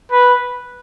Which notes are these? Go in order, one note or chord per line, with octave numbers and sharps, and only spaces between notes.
B4